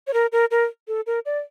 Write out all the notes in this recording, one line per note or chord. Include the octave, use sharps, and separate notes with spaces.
C#5
A#4
A#4
A#4
A4
A#4
D5